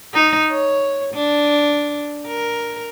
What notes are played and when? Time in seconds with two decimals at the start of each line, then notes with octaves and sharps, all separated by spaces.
0.13 D#4
0.50 C#5
1.14 D4
2.27 A#4